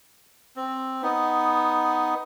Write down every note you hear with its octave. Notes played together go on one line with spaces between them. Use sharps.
C4
B3 D#4